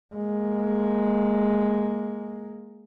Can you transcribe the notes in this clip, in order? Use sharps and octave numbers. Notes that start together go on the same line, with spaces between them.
G#3 A#3